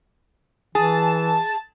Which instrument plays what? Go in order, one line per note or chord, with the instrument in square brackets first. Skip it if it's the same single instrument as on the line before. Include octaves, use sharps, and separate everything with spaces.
[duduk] E3 [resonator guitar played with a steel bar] G#4 [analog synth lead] A5